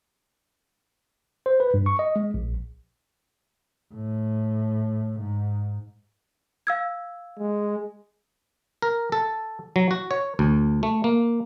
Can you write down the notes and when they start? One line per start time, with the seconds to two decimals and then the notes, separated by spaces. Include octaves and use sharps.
1.46 C5
1.60 B4
1.74 G2
1.86 C#6
1.99 D#5
2.16 G#3
2.34 A#1
3.94 A2
5.19 G#2
6.67 F5 E6 G#6
7.39 G#3
8.82 A#4
9.12 A4
9.76 F#3
9.91 F#4
10.11 C#5
10.39 D2
10.83 A3
11.04 A#3